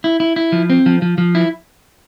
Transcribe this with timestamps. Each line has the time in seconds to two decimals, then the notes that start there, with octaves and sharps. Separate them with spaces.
0.04 E4
0.20 E4
0.36 E4
0.52 F3
0.70 C4
0.86 F3
1.02 F3
1.18 F3
1.35 E4